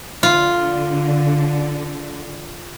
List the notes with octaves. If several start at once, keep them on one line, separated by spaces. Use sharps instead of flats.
D3 F4